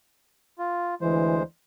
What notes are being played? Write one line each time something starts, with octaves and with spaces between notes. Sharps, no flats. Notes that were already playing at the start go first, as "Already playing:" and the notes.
F4
D2 E3 G#3 C5